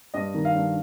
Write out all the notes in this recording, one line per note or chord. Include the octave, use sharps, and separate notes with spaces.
G2 D#5
D#3
F5
G2